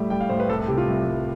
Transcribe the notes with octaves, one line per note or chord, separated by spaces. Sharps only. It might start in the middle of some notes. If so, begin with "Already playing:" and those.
Already playing: A2 G3 A3 E5
G3 G5
F5
A2 C5
B4
C2 A4
A4
C3 G4
F4
C2
C2